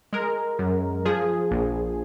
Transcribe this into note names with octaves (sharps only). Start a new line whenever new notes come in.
G#3 A#4
F#2
F3 G#4
A#1